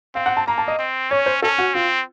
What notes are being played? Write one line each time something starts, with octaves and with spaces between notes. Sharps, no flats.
C4 F5
F#5
A5
A#3 A#5
A5
D#5
C4
C#4 C#5
C5
C#4 A4
F#4
C4 F4